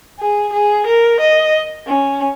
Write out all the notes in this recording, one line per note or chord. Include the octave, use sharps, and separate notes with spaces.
G#4
G#4
A#4
D#5
C#4